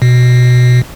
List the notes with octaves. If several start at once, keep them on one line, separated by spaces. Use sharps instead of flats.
B2